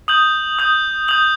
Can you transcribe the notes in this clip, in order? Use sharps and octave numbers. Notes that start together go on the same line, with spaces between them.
D#6 G6 F#7
D#6 G6
D#6 G6 F#7